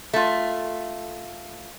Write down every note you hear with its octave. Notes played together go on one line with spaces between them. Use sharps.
A3 F4